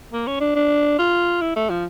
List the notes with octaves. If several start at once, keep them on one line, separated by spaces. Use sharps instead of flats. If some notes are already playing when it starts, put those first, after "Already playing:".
A#3
C#4
D4
D4
F4
E4
A3
F3